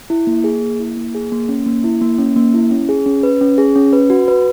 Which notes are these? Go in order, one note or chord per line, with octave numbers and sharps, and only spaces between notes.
E4
A#3
G#4
A#3
E4
A#3
G#4
A#3
C#4
A#3
E4
A#3
C#4
A#3
E4
C#4
G#4
C#4
B4
C#4
G#4
C#4
B4
F#4
B4